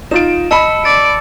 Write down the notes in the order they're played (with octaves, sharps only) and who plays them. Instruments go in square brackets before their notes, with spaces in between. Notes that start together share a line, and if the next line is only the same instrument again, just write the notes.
[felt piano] D#4 F4 D7 [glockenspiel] E7
[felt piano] D#5 B5 [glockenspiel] A5 E6 C#7
[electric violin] D5 D7 [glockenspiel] D6 A6